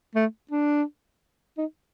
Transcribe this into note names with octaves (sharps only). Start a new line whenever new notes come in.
A3
D4
D#4